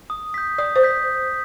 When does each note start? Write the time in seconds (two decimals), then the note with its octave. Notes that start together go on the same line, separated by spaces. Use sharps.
0.10 D#6
0.34 G6 B6
0.58 D5 D#6
0.76 C5
0.83 G6 B6